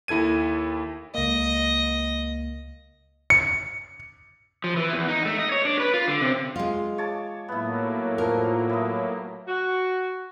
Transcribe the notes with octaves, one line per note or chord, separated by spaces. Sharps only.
D#2 E4 A4 G#6 D#7
C#2 A#3 D#5
C#7
F3
E3
E2
D#4
A3
D#5
C#5
D4
B4
F4
D3
C3
G#3 F4
C#5 A5 D6
A2 F#3 A#3 B3 E4
F3 A#4
E4 D#5
F#4